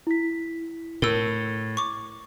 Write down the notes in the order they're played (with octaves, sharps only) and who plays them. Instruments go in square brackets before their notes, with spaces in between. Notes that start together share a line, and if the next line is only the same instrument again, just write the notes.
[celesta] E4 B6
[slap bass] A2 [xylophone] A#4 E6
[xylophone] C#6 D6